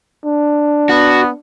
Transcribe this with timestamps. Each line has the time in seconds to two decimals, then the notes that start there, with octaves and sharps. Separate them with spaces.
0.25 D4
0.89 B3 F#4